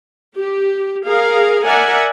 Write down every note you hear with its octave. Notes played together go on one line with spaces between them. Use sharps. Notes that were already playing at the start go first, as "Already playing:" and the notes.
G4
G#4 A#4 F5
A#4 D5 E5 F#5 G#5